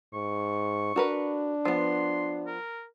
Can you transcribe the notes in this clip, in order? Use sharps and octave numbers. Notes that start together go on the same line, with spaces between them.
G#2 C#6
D4 F#4 A#4 B4
F3 B3 C6
A#4